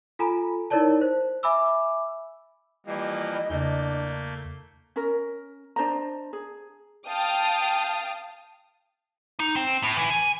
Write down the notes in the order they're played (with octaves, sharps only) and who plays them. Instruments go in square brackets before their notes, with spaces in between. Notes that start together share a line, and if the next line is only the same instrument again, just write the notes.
[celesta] F4 A4 G#5 A#5 B5
D#4 E4 A#4 C#5 D5 A5
C5
E5 G#5 B5 D6 E6
[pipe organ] E3 F3 A#3 [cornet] G3 [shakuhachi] D#5
[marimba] E2 C#3 [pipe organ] A3 A#3 G6 [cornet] D4
[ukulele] C#4 A#4
D4 C5 D#5 A#5
G#4
[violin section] F5 G5 A5 D#6
[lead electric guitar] D#4
C4
A2
E3
G#5